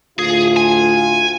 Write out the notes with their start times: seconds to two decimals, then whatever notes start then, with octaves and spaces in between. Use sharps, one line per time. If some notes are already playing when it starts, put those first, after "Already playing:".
0.19 D2 A2 F4 G#4
0.56 G#5